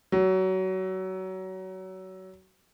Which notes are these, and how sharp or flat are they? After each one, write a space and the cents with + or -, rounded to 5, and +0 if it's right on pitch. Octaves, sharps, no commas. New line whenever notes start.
F#3 +25